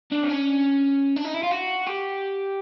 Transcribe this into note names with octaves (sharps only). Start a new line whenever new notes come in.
D4
C4
C#4
D4
D#4
E4
F4
F#4
G4